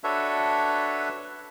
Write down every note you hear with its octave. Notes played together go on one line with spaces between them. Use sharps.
D4 F#4 A4 B4 C#5 E5